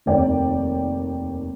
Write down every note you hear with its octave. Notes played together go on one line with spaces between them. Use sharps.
F1 D#2 D5 G5